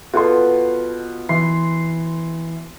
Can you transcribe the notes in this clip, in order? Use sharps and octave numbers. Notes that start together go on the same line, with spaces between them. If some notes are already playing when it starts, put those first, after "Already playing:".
B2 F4 A4 C6
E3 C6